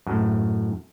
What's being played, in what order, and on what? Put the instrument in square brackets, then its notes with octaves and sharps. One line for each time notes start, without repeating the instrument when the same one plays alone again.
[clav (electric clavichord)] F#2 A2